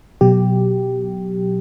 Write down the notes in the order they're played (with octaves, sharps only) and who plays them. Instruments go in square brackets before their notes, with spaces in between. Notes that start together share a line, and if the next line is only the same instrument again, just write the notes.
[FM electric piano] B2 F#3 G4